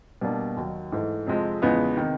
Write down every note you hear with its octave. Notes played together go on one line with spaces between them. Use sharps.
B2 G3 A#3 D4
D#2 D#3 F#3
G#2 E3 A3
F2 C3 F3 G#3 C4
E2 C#3 F3 G#3 B3
C3 D#3